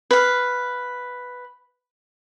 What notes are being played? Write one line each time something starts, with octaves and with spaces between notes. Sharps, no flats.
B4 F5